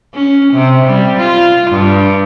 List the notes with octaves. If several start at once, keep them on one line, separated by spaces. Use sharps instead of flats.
C#4
C3
G3
F4
G2